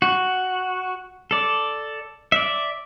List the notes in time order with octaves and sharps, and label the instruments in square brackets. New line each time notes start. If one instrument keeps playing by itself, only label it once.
[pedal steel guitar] F#4
A4 D5
D5 E5